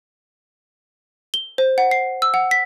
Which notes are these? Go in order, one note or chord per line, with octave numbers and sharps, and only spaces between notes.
G7
C5
F#5
C7
E6
F#5
B6